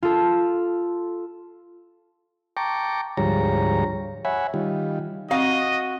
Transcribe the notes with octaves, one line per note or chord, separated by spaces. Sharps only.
F4 A4
G5 A5 A#5 C#6 D6
D2 G#2 F3 G3 C#5 A#5
C#5 E5 F#5 G#5 B5
D#3 G3 F4
C4 F#4 D#5 F5